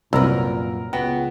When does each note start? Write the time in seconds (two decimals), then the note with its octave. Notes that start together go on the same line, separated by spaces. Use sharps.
0.13 C2 F#2 A#2 A#4 B4 A#5 E6
0.93 C#2 B3 F#4 G5